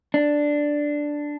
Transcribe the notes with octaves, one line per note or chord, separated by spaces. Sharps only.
D4